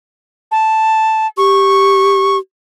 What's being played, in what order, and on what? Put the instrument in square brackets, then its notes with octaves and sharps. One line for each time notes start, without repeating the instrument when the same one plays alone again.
[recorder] A5
[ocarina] G4 [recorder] C#6